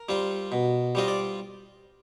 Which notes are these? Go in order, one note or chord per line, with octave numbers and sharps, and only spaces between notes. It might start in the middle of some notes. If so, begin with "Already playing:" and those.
Already playing: A#4
G3 C4 F4
B2
G3 C4 F4 D#5
D5